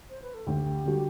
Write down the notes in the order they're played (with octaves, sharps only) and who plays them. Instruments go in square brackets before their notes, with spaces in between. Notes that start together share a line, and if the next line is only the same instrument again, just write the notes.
[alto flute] C5
B4
A4
[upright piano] D2 [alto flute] G4
[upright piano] D3 G3 D4 F#4